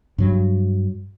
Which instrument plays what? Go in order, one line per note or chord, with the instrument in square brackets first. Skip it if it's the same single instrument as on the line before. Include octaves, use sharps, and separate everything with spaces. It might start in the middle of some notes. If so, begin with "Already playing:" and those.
[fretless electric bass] G2 F#3